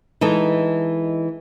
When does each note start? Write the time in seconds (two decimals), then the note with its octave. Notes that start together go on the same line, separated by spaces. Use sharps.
0.21 E3 G#3 D#4 A4